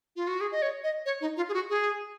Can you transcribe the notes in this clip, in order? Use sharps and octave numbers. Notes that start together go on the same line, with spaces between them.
F4
F#4
G#4
D#5
C#5
D#5
C#5
D#4
F4
G#4
F#4
G#4